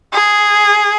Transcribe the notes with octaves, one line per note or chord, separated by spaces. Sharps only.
G#4